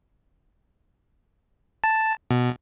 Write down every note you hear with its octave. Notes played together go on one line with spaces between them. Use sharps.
A5
B2